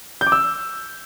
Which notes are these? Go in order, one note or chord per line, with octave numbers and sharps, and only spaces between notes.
G6
D6
E6